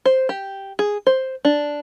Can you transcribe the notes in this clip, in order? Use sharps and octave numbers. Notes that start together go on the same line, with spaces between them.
C5
G4
G#4
C5
D4